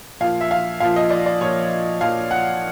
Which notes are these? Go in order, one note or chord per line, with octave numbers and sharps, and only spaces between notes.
A#2 F3 F5
E5
F5
A#2 F3 F5
D#5
D5
D5
A#2 F3 C#5
A#2 F3 F5
F#5